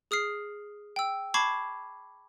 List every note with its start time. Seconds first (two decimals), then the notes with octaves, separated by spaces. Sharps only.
0.11 G#4 D#6 F6 C7
0.96 G5 E6
1.34 A5 B5 C#6 D6 G#6 C7